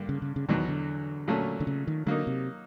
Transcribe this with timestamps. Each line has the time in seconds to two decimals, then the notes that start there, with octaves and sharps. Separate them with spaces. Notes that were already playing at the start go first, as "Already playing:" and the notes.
Already playing: G2 D3 A#3
0.09 C#3
0.22 C#3
0.36 C#3
0.49 E2 B2 D#3 F#3
0.68 D3
1.28 A#2 F#3 A3 C#4
1.60 D3
1.67 C#3
1.87 D#3
2.07 D3 F#3 A#3 D#4
2.27 C3